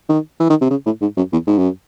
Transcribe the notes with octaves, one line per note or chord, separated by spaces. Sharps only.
D#3
E3
D#3
C3
C#3
A2
G#2
F#2
E2
G#2
F#2